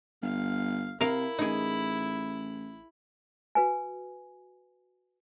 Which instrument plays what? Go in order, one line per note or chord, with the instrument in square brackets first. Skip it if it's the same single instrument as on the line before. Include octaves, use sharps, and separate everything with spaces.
[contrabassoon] G1 [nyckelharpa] F5
[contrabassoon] C3 [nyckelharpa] E4 B5 [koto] A#4 F5
[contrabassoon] A1 [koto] D#4 G#4
[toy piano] F#4 B4 G#5